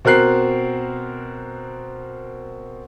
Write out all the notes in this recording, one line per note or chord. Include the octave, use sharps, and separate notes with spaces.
B2 C4 A#4 F#6 C7